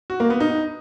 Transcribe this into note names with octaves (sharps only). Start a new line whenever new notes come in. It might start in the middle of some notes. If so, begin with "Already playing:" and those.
F#4
A#3
B3
D#4